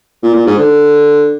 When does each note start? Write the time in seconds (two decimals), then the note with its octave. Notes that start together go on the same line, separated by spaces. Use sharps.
0.23 A#2
0.34 A#2
0.46 G#2
0.58 D3